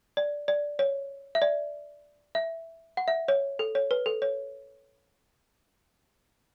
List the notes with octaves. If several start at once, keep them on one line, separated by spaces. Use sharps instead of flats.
D5
D5
C#5
E5
D5
E5
F#5
E5
C#5
A4
C#5
B4
A4
C#5